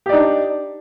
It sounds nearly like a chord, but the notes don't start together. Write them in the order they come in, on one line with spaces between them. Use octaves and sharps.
G4 D5 D#4 D4